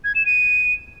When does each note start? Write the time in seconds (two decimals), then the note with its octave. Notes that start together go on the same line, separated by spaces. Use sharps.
0.04 G#6
0.15 E7
0.26 D#7